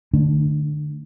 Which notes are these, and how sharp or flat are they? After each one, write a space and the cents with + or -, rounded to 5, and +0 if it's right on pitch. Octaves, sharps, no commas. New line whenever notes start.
D3 +30 A3 +0 D4 -25